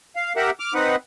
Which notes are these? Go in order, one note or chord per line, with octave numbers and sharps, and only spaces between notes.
F5
G4 A#4 E5 F#5
D6 F6
C4 D#4 B4 F#5